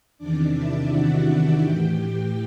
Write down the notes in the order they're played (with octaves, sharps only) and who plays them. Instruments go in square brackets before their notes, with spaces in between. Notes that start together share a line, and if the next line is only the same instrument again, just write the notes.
[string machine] E2 C3 D#3 D4 D5
E4 E5
F#4 F#5
A2 E3 G4 G5